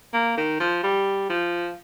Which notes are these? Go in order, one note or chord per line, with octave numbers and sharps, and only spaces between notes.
A#3
D#3
F3
G3
F3